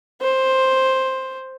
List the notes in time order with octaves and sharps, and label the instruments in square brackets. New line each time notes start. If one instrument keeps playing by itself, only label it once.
[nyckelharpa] C5